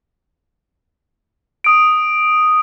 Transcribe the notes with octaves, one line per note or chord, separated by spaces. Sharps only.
D#6 D7